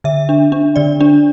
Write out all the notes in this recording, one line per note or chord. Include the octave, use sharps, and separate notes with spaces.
D3 E5
D4
D4
D3 D5
D4